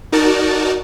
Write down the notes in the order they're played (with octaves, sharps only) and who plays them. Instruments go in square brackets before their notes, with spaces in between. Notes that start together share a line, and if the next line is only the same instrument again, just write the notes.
[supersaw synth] D#4 F#4 A#4 D5 A5